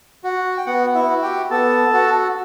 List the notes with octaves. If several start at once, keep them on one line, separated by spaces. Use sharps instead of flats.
F#4
G5
B3 F#4 F#5
E4 E5
F#4
G4 G5
B3 A4 A5
F#4